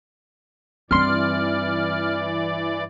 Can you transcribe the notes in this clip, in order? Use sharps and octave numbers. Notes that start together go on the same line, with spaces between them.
G2 E3 C4 D#4 D5 C6 F6